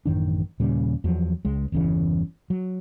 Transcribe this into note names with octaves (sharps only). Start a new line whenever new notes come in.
A1 F#2 D#3 D4
D#2 A#2 C#3 G3
E2 F3 F#3
C#2 G#3
G1 E2 C#3 E3
F#3